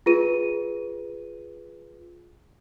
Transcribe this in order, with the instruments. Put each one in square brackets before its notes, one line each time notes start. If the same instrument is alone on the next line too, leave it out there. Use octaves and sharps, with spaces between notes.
[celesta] F4 G#4 B4 D#7